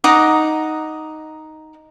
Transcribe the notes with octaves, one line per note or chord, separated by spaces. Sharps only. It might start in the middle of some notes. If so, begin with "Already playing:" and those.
D#4 F#5 A#5 D6